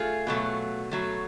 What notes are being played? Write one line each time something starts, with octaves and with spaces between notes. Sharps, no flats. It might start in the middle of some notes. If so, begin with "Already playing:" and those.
Already playing: A3 F4 G#4
B2 F#3 A3
B2 F#3 A3